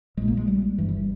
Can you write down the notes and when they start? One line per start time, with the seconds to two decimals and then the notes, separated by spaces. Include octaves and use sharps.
0.17 A#1 A#2 G#3
0.28 A#3
0.37 G#3
0.48 G3
0.78 G1 G2 E3
0.89 E3
0.99 G3